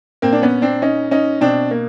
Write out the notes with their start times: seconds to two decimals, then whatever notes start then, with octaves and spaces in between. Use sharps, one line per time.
0.22 A#2 A#3 C4
0.33 D4
0.42 B3 C#4
0.62 C4 D4
0.82 C#4 D#4
1.11 C#4 D#4
1.41 B2 C4 D4
1.71 A#3